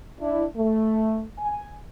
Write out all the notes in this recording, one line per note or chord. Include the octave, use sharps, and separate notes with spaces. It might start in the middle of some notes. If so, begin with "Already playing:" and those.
D4 E4
A3
G#5